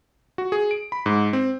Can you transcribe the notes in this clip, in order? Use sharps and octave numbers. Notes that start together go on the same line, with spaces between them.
F#4
G#4
D7
B5
G#2
C4